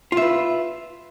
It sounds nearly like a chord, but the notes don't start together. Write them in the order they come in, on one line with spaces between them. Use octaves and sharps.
F4 E5 B4